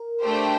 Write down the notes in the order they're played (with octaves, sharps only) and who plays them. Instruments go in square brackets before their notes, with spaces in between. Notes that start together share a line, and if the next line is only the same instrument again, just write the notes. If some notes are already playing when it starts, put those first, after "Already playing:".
Already playing: [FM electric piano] A#4
[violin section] A3 D4 G4 C5 G5